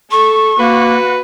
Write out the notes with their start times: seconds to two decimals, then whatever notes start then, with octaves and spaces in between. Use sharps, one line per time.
0.11 A4 C#6
0.59 A#3 F#4 B4